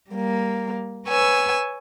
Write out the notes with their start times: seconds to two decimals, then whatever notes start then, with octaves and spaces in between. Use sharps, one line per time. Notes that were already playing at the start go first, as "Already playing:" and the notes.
0.10 G3 A#3
1.07 B4 C#5 G#5 E6